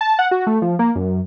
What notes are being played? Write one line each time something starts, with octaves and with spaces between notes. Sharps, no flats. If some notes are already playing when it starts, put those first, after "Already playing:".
A5
F#5
F#4
A3
F3
A#3
F#2